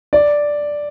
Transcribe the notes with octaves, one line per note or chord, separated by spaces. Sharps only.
D5